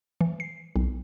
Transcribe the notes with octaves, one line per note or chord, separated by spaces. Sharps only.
E3
C7
B1